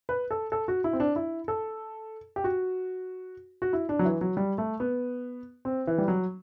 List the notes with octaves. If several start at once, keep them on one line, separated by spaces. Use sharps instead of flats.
B4
A4
A4
F#4
E4
C4
D4
E4
A4
G4
F#4
F#4
E4
D4
F#3
E3
F#3
G3
A3
B3
C4
E3
G3
F#3